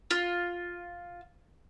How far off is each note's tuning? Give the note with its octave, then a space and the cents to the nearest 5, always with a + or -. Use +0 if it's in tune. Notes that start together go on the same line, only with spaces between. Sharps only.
F4 +5